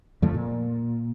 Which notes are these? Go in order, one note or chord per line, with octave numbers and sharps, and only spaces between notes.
F2 D3 F3 A3
A#2